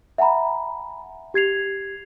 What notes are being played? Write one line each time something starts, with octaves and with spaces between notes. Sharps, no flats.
E5 F#5 G#5 A#5 B5
G4 G#6 C7 F7